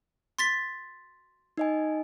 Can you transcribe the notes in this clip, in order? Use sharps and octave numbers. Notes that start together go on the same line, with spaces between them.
C6 A6 B6
D#4 D#5 G#5